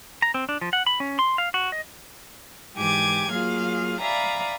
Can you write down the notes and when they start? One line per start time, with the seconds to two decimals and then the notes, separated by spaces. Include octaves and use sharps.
0.22 A#5
0.34 C4
0.49 D4
0.61 F3
0.73 F#5
0.87 B5
1.00 C#4
1.19 C6
1.38 F5
1.54 F#4
1.72 D#5
2.75 G#2 E3 G4 G#5 D6 G#6
3.30 F#3 A#3 F4 G#4 F5
4.01 D5 E5 F5 G#5 A#5 B5